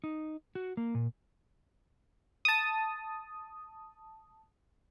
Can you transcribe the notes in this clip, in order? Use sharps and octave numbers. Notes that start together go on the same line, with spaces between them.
D#4
F#4
A#3
A#2
A5 D#6